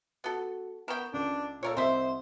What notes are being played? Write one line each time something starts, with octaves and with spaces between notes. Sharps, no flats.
B3 F#4 A4
B3 A#4 G5 C#6 E7
C#2 D4
A#2 A4 A#4 C#5
C2 C5 D#5 E5